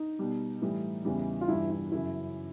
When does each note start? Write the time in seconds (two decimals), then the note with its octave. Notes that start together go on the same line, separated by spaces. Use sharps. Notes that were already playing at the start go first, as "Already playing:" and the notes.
Already playing: D#4
0.19 B2 G3
0.62 A2 E3 G3
1.05 E2 C#3 E3 G3
1.41 F4
1.48 G2 E3 G3 E4
1.70 E4
1.92 F#2 C#3 F#3 E4